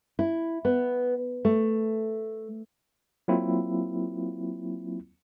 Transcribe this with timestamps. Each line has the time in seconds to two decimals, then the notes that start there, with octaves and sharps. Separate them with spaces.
0.19 E4
0.65 B3
1.45 A3
3.28 F#3 A#3 C4 E4 F4